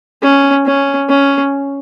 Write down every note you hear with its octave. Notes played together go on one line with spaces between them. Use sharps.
C#4
C#4
C#4